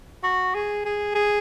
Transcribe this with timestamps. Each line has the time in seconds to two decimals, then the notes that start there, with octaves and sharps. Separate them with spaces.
0.24 F#4
0.55 G#4
0.85 G#4
1.15 G#4